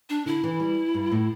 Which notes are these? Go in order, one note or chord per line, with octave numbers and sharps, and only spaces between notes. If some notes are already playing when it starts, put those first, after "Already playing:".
D4
D3 E4
E3
G3
G2
A2